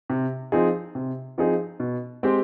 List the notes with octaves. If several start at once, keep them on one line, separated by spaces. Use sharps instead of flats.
C3
F3 C4 D#4 G#4
C3
F3 C4 D#4 G#4
B2
G#3 C4 G4